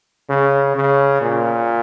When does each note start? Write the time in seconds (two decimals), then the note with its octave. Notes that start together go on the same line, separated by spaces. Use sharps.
0.30 C#3
0.76 C#3
1.21 A#2